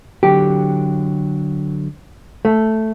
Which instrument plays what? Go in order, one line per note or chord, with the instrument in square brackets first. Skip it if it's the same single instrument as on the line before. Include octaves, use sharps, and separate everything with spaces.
[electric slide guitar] D3 F#3 [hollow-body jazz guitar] G4
[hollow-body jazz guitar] A3